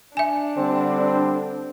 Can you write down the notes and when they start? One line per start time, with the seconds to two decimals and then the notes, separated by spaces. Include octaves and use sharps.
0.17 D4 E5 G#5
0.57 D3 G3 C4